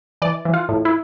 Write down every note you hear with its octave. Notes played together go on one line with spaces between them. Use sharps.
E3 D5
E3
F4
A2
E4